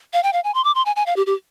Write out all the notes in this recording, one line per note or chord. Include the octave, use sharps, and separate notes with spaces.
F5
G5
F5
G#5
C6
D6
C6
G#5
G#5
F5
G4
G4